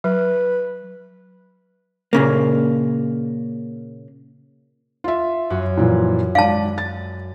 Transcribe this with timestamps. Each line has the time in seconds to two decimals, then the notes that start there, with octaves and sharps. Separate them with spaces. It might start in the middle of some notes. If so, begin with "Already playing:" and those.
0.04 F#3 B4
2.13 A#2 C#3 A#3
5.04 F4 E5
5.50 F#2 F#4
5.77 A#2 E3 F3
6.35 G#1 D5 F5 A5
6.78 A6